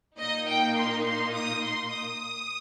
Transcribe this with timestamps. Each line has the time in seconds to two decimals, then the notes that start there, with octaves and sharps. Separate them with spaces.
0.19 A#2 A#3 D#4 D#5
0.48 G5
0.77 C6
1.05 C6
1.33 D#6
1.62 C6
1.91 D#6